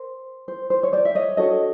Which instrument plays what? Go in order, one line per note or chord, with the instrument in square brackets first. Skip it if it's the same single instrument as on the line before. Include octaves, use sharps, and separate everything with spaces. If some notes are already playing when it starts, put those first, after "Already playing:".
Already playing: [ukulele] A#4 C5
C5
C5
C#5
C5 D5
E5
C#5 D#5
D4 F#4 A4 C#5 D#5